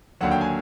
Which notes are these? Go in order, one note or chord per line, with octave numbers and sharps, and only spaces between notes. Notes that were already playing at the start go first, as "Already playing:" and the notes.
D#2 D3 F#3 F#5
G5
G#5